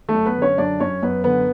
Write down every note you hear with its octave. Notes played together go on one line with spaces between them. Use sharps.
A3 A4
F#2
B3 B4
D3
C#4 C#5
F#2 D4 D5
F#2 C#4 C#5
F#2 B3 B4
D3 B3 B4